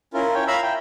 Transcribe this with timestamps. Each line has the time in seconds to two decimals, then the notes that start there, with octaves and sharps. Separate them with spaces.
0.14 C#4 E4 F4 A#4
0.34 C#5 G5
0.47 E5 F5 A#5 B5 E6
0.63 G5